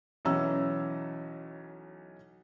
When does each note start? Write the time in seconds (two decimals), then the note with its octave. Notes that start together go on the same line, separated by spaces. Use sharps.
0.25 B1 E3 C#4 A#5 E6